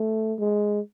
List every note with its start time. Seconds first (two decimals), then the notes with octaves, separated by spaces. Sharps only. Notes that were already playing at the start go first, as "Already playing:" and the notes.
Already playing: A3
0.39 G#3